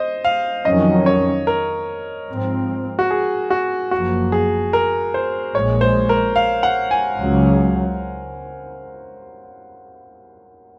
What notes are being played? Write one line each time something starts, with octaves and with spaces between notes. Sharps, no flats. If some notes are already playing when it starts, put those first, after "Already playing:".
Already playing: C5 D#5
F5
F2 D#3 F#3 C#4 D#5
C#5
A#4
G#2 F3 C4
F#4
G#4
F#4
F#1 F#2 F3 A#3 F#4
G#4
A#4
C5
A#1 A#2 G#3 C#5
C5
A#4
F5
F#5
G#5
C#2 C#3 F#3